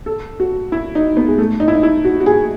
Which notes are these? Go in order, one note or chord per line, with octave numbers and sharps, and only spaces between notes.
A4
F#4
E4
D#4
B3
G#3
A3
D#4
E4
D#4
E4
F#4
F#4
G#4